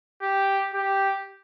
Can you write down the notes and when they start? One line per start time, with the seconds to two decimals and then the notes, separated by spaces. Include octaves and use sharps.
0.22 G4
0.74 G4